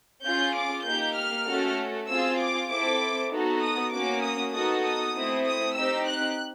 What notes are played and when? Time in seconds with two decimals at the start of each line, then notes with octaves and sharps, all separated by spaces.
0.24 C#4 F4 G#4 G6
0.55 D6
0.85 A#3 D#4 G4 G6
1.16 F6
1.47 A3 C#4 F#4 A4
2.08 C4 F4 G#4 E6
2.39 D6
2.69 C4 E4 A4 D6
3.31 B3 D#4 F#4 A4
3.62 D#6
3.92 A#3 C#4 F#4 D6
4.23 D#6
4.53 B3 D#4 F#4 A4 D#6
4.84 D#6
5.15 A3 C4 E4
5.46 D#6
5.76 C4 D#4 G4 E6
6.08 F#6